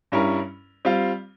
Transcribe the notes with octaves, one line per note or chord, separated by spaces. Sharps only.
G2 G3 C#4 E4 A#4
G3 C4 F4